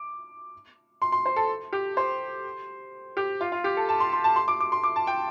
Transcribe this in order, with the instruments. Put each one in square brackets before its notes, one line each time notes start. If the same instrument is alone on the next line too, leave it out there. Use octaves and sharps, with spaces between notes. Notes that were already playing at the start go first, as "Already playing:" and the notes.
Already playing: [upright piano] D6
C6
C6
C5
A4
G4
C5
G4
F4
F4
G4
A4
A5
C6
C6
A5
C6
D6
D6
C6
D6
A5
G5